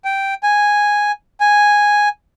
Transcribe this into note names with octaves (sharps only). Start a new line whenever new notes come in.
G5
G#5
G#5